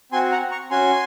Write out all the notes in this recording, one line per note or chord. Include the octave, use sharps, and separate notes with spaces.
C4 F#4 G#5 C6
F#5 A#5
A#5 C#6
C#4 F#4 G#5 C6